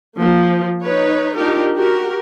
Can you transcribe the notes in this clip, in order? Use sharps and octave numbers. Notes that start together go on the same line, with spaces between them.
F3 A#3
D#4 B4 C#5
D4 D#4 F4 G4 A#4
F#4 G4 A#4